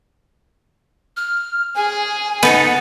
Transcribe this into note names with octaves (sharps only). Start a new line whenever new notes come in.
F6
G#4 G#5
B3 D#4 A4 F#5